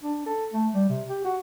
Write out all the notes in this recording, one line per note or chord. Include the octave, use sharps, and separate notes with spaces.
D4
A4
A3
G3
C3
G4
F#4